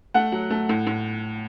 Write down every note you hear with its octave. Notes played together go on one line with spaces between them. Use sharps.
A3 F#5
F#3
A3
A2
A2